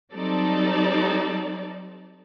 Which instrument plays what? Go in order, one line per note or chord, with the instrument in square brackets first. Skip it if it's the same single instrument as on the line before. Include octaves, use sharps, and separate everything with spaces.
[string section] F#3 G3 C4 D#4 A4 D5